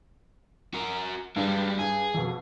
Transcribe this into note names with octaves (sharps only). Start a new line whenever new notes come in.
F#4 A#4
G2 G3 G#3
G2 G#4
F2 B2